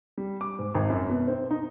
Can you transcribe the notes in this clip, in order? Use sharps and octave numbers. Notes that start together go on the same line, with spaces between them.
G3
D6
G#2
G#1
F#2
B2
C4
D#4